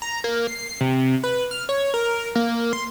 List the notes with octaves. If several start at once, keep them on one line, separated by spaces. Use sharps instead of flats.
A#5
A#3
C7
C3
B4
F6
C#5
A#4
A#3
C6